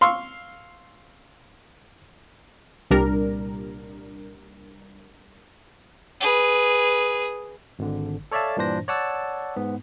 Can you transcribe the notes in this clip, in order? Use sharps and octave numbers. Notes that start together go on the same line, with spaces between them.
F5 C6 C#6 E6
C2 A#2 G3 D4 A#4
G#4 B4
G#1 D3
A4 C#5 D5 E5 F5 A5
G2 A#2 E3 D4 C5 A#6
C#5 D5 F#5 A5 E6
G#2 B3